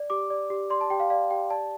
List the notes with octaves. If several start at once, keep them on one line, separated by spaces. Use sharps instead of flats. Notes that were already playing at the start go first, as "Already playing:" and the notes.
Already playing: D5
G4 D6
D5
G4
D5 C6
A5
G4 G5
F5
D5 F5
G4 G5
D5 A5